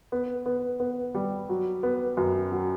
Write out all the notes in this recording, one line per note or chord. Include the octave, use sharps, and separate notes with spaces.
B3
B3
B3
G3
F#3
B3
F#2
F#3